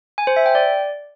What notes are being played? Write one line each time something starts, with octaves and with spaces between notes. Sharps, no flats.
G#5
C5
E5
G5
D5